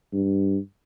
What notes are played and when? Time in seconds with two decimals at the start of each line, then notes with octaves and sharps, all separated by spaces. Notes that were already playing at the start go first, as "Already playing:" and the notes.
0.13 G2